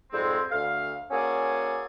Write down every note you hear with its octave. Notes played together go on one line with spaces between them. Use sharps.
F2 G#2 G3 G#3 C4
D2 F5
A#3 C#4 F#4 G#4 A4 D5